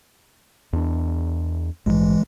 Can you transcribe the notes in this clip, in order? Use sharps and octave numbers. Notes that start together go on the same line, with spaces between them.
E2 D4
A#1 G#2 E3 G#3